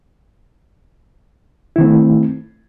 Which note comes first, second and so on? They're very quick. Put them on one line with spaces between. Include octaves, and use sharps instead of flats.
E4 D#3 C4 A3